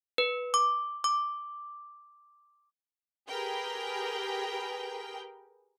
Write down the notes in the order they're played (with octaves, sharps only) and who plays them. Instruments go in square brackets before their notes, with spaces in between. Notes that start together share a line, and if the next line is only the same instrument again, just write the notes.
[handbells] B4
D6
D6
[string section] G4 G#4 A#4 B4 G5